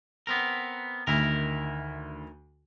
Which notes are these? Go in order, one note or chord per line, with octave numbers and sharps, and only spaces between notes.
B3 C4 A#4
D2 D#3 E4 A#4